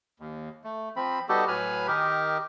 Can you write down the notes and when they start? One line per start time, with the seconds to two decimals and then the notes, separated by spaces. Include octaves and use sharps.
0.20 D#2
0.64 A3
0.96 F3 C4 B5
1.29 G3 B3 D#4 F#4 G4 A4
1.48 A2 F#3 B4 G#5 B5 F6
1.87 D#3 D#4 G4 A#4